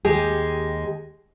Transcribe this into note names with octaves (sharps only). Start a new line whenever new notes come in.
D#2 G#3 G4 G#4